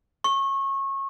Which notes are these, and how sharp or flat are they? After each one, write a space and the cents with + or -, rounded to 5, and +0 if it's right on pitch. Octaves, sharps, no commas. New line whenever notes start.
C#6 -25